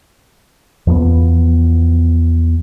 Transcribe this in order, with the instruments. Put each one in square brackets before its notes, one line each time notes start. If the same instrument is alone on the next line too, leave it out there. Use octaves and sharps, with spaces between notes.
[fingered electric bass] E2 F3 A#3 B3